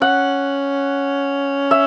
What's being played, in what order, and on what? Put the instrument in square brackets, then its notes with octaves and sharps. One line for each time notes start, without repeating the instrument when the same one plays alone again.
[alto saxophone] C#4 [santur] F#5
[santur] E5